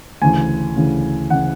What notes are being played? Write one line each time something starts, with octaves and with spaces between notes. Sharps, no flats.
D2 C#3 E3 G#5
D2 C#3 E3
C#3 E3 F#5